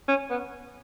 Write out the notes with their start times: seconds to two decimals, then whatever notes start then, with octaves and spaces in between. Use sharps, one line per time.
0.08 C#4
0.30 B3